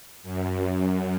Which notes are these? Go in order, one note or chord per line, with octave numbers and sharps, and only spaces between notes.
F#2